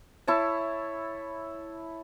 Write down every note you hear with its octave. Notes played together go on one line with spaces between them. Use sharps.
E4 C#5 A5